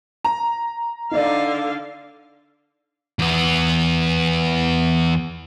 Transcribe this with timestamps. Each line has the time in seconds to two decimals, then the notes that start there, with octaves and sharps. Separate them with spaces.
0.25 A#5
1.11 D3 D#4 D5 F5
3.19 E2 B3